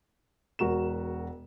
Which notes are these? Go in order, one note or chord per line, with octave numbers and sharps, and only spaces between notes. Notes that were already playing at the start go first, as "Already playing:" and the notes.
E1 F#4 A#4 E7